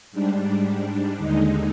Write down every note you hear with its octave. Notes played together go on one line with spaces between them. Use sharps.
G#2 G3 D4
D#2 D3 G#3 D#4